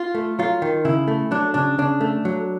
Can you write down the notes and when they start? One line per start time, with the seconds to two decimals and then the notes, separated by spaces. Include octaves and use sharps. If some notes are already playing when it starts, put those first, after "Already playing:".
Already playing: F4
0.15 A3
0.39 F#3 F4
0.62 D#3
0.85 C#3 E4
1.08 A3
1.31 F#3 D4
1.54 C#3 D4
1.78 C#3 D4
2.01 A3
2.25 F#3